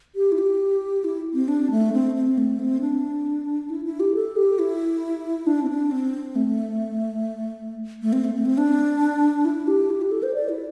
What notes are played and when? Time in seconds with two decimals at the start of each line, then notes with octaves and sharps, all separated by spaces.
0.15 G4
0.32 E4
0.38 G4
1.04 E4
1.34 C4
1.48 D4
1.71 A3
1.93 C4
2.15 C4
2.38 A3
2.59 C4
2.81 D4
3.70 E4
3.85 E4
4.00 G4
4.15 A4
4.36 G4
4.59 E4
5.47 D4
5.63 C4
5.70 D4
5.91 C4
6.35 A3
8.02 A3
8.13 C4
8.24 A3
8.35 A3
8.45 C4
8.58 D4
9.45 E4
9.68 G4
9.90 E4
10.01 G4
10.11 A4
10.23 C5
10.34 D5
10.49 E4